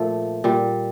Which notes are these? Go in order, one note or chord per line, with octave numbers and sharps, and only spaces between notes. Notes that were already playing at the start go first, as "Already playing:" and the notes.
Already playing: A#2 F3 A3
A#2 G3